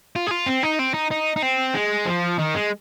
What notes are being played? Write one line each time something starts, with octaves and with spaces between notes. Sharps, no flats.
F4
G#4
F4
C4
D#4
C4
D#4
D#4
D#4
C4
G#3
F3
D#3
G#3